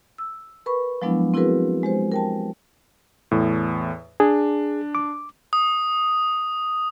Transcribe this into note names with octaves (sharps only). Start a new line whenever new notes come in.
E6
A#4 B4 B5 C#6
F3 F#3 G#3 B3 D4 E4
C4 E4 F#4 G#4 A#4 B4
G#3 G4 C5
A#4 G5 A5
E2 A2
D4 G#4
D6
D#6